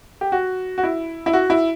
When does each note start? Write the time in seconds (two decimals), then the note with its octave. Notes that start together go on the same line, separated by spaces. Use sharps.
0.21 G4
0.32 F#4
0.78 F#4
0.83 E4
1.26 E4
1.33 F#4
1.50 E4